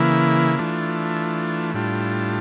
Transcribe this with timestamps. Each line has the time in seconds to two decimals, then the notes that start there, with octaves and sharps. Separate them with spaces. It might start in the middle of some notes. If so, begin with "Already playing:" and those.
Already playing: C#3 E3 A#3 E4
0.59 E3 A3 D4 F4
1.74 A2 G3 D4 F4